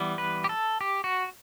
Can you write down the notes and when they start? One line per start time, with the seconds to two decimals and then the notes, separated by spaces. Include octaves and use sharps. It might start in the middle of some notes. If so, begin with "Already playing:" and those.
Already playing: E3 G3 B3
0.18 B4
0.44 G4
0.49 A4
0.81 G4
1.04 F#4